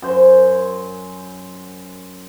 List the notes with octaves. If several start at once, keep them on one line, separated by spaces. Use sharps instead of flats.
F#2 C5